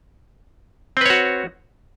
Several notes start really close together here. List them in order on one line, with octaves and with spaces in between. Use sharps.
C4 B4 C#5 F#4